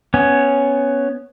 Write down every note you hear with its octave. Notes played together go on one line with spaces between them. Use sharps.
B3 C#4